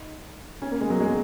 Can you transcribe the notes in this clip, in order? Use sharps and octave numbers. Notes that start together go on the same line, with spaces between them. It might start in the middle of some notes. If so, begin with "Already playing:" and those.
Already playing: D#4
C#4
A#3
G#3
F#3
G#3